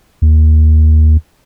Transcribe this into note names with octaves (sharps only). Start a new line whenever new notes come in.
D#2